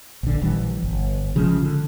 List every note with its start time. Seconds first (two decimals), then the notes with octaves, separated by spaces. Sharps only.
0.23 A#1 D3
0.41 A#1 D#3 E3 G3
0.83 G1
1.35 A1 C#3 F3 G#3
1.63 D3